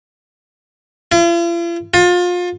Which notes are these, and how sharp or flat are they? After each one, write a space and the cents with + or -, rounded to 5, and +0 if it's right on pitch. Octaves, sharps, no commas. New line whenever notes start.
F4 -45
F4 +30